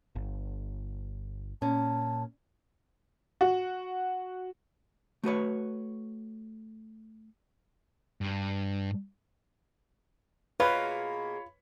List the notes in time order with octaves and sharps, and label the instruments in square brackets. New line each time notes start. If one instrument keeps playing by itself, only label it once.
[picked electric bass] G1
[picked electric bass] A#2 [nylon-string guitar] C#4 [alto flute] A5
[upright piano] F#4
[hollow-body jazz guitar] A3 F#4 B4 C#5
[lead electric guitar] G2
[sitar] B2 A#3 G#4 [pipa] F4 [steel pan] B4 [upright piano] C#5 B5